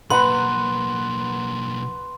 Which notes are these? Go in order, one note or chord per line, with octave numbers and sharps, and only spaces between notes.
B1 A#3 B4 F#5 A#5 C6